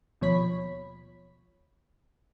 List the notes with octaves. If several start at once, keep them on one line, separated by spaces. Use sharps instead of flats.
D#2 B2 F3 C#5 B5 B6